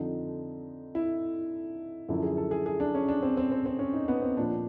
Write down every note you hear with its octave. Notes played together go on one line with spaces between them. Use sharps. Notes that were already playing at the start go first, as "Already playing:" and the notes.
Already playing: F2 D3 F3 D#4
E4
F#2 D3 F3 E4
G#4
A4
G#4
G#4
D4
C#4
D4
C4
C4
C4
C4
C#4
D#4
B3
C4
A#2 F3 D4